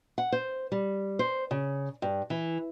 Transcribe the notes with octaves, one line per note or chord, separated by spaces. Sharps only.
F#5
C5
G3
C5
C#3
G2
E3